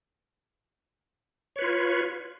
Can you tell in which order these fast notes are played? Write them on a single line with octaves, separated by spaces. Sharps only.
C#5 B4 F4